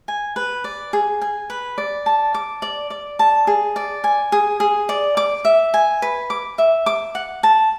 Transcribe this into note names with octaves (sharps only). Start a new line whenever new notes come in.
G#5
B4
D5
G#4
G#5
B4
D5
A5
D6
D5
D5
A5
G#4
D5
G#5
G#4
G#4
D5
D6
E5
G#5
B4
D6
E5
D6
F#5
A5